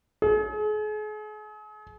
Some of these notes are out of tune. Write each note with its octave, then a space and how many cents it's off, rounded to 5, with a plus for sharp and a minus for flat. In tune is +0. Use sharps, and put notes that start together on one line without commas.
G#4 +40